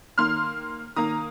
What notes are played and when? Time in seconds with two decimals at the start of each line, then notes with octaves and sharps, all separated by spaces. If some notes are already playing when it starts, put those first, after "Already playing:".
0.18 D#3 A#3 C6 F6
0.96 D#3 A#3 A#5 D#6